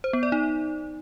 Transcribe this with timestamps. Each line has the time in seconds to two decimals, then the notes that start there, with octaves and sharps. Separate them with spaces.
0.04 C5
0.13 B3
0.23 D5
0.32 D#4